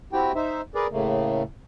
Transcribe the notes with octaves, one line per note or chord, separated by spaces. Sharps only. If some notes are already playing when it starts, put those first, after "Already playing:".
C4 E4 F#4 G4 G5
D#4 C5 E5
G#4 A#4 B4 D5
A2 C#3 A3 A#3